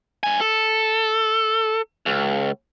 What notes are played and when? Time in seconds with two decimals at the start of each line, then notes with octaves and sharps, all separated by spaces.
0.23 G2 G#5
0.40 A4
2.06 C#2